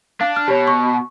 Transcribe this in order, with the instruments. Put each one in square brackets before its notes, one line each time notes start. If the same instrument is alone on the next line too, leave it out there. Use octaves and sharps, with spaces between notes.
[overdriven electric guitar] D4 [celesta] F5
[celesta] F6
[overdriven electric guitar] B2 [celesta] G4 C#5
[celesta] C#6